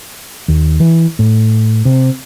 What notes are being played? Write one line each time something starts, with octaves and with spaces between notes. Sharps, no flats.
D#2
E3
A2
C3